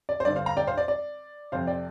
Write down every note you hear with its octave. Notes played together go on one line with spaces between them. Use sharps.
D5
C5
G2 D3 D5
C5 F5
F5 A#5
D5 G5
C5 F5
D5
D5
F2 C3 C5 F5
D5 G5